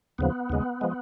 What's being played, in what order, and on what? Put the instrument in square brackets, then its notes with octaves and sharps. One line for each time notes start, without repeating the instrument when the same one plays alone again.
[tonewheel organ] D#2 C#3 F3 B3
D#2 C#3 G#3
F3 G#3